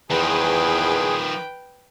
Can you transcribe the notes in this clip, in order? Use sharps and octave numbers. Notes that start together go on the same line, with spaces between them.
E2 D#3 F3 G#4 B4 G5